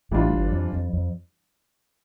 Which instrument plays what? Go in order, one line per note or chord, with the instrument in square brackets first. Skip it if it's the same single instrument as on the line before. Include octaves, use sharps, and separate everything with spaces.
[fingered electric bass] A1 A2 [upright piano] E3 G3 D4 F4
[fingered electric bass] G1 G2
F2
F2
F2